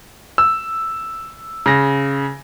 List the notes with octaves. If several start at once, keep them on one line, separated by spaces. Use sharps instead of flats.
E6
C#3 A#6